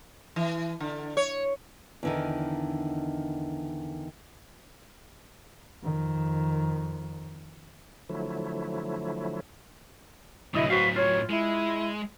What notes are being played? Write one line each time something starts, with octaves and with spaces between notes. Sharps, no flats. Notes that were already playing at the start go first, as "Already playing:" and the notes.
E3
D3
C#5
E2 D3 D#3
F2 D#3
D3 F3 F#3 A3 E4
C2 A2 D3 F#3 E4 D#5
F#4 B4 C5 F5
F4 C#5
G#3 E4